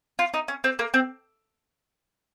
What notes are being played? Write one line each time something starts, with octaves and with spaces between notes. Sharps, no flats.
F4
D#4
C#4
C4
A#3
C4